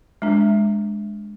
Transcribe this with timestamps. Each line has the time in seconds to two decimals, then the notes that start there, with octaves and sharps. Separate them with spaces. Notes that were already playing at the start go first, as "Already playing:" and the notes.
0.22 G#3 D4